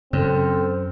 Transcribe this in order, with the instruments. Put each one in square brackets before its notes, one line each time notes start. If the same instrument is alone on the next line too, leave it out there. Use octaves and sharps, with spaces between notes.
[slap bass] F#2 [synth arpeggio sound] C#3 [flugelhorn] C4 [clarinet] A4